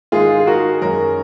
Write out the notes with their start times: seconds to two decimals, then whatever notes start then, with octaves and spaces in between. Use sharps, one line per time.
0.12 G#2 D#3 G#3 F4 G#4
0.40 G#4
0.46 F#4 A#4
0.82 F#2 D#3 G#3 A#4 C#5